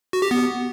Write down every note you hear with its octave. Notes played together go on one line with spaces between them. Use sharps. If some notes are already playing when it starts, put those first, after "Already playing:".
F#4
G4
B3